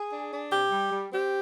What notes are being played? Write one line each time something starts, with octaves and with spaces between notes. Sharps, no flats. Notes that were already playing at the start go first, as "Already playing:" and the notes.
Already playing: G#4
D4
D4
C3 G4
G3
G3
C4 G4